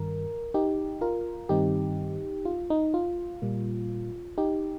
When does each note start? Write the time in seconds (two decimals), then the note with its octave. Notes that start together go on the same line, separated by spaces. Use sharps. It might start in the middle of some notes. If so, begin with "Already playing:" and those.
Already playing: G2 D#3 G3 A#4
0.54 D#4 G4
1.01 F4 A#4
1.49 G2 D#3 G3 C4 D#4 G4
2.45 F4
2.70 D#4
2.94 F4
3.42 A#2 G3 A#3
4.38 D#4 G4